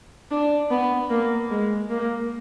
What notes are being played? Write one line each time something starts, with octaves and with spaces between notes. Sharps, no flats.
D4
B3
A#3
G#3
A#3